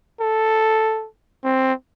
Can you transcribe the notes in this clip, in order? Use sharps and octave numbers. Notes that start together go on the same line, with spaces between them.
A4
C4